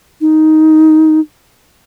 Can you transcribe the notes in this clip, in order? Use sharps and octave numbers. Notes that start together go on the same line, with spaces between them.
D#4